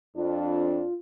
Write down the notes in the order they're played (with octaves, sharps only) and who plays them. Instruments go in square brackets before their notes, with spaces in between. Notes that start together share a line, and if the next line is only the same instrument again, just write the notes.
[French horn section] F2 D4 [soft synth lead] F4